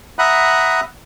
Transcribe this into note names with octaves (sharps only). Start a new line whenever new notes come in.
E5 F#5 A#5 B5 D#6 F#6